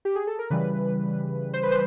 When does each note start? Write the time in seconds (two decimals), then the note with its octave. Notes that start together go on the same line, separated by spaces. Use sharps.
0.05 G4
0.15 G#4
0.27 A4
0.39 A#4
0.50 C#3 E3 G3 B4
1.54 C5
1.63 B4
1.71 C5